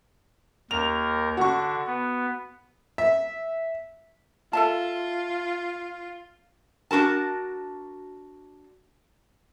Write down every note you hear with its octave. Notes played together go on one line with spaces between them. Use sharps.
D#2 A#4 F7
D3 F#4 C#6
B3
E5
F4 A4 E5 A5
D4 F#4 A#4 A5